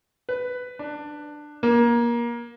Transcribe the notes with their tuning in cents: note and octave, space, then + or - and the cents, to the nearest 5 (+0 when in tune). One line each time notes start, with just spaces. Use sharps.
B4 +10
D4 +15
A#3 +25